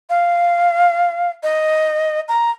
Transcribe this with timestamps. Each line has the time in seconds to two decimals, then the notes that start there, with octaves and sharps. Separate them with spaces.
0.10 F5
1.43 D#5
2.28 A#5